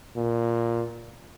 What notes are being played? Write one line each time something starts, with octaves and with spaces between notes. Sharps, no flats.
A#2